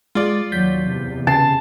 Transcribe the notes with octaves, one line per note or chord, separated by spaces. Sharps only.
G#3 F4 D5
D#2 F#3 G6 B6
E2 C3
C#3 A5 C7